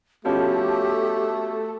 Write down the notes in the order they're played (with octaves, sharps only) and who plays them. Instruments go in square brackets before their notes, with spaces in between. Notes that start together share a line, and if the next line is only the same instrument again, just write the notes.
[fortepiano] B2 F3 C#4 [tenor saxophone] A3 [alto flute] G4 [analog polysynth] A4